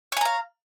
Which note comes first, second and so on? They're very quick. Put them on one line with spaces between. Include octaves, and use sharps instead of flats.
C#5 G#5 A#5 F5